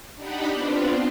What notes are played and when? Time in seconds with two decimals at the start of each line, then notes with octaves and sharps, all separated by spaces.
0.16 D4 D#4 G4 F#5 B5
0.51 B3 C4 D4 F4